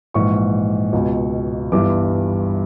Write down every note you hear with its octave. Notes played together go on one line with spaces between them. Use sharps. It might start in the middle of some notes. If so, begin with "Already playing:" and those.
A#1 G#2 E3 C#6
C#2 B2
G1 G2 E3 D6